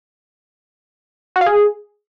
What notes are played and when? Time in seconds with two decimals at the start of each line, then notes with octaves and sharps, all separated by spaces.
1.36 F#4
1.41 F5
1.46 G#4